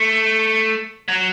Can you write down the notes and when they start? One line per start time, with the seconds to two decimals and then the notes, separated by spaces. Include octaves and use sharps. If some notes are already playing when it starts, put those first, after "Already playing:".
Already playing: A3
1.08 F#3